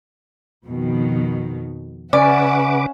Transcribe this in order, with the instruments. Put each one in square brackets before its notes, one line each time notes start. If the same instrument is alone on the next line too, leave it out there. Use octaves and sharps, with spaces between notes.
[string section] F2 B2 D#3
[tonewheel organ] C#3 B4 D6 [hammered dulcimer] C#4 [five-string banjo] D5 [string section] E5 F#5